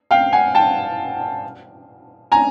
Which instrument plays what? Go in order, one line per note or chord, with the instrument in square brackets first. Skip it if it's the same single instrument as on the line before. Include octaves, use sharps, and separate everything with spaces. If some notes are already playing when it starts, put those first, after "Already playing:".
[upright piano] F5 G5
F#5 G#5
G5 A5
G#5 A#5